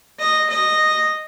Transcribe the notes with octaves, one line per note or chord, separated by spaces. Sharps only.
D#5
D#5